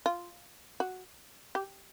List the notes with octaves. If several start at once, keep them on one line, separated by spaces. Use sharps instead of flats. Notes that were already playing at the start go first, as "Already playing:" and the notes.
F4
F#4
G4